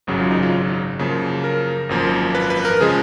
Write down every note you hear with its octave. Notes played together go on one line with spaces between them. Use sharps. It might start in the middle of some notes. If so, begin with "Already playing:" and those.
G#1 F#2 C#3 F#3
F4
D#4
F4
F#2 C#3 F3 A#3
A#4
G#1 F#2 F3 A#3
B4
B4
A#4
C#3 F3 G#3 G#4